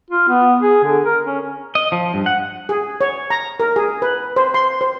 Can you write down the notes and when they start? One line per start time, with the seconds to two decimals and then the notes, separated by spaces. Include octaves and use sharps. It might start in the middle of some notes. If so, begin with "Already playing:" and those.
0.11 F4
0.29 B3
0.62 G#4
0.84 D3
1.05 A#4
1.25 C#4
1.75 D#5
1.92 F3
2.14 G2
2.26 F#5
2.69 G#4
3.01 C#5
3.30 A#5
3.60 A#4
3.76 G#4
4.02 B4
4.36 C5
4.54 C6
4.81 C5